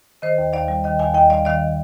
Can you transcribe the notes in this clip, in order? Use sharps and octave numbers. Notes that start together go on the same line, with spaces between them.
D#3 C5 D#5
D#2
D#2 D5 F5
G3
D#3 D#5 G5
D#2 F5 G#5
D#2 D#5 G5
G3 D5 F5
D#3 D5 F5